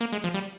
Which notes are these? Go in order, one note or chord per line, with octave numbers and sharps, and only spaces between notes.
A#3
G#3
F3
G3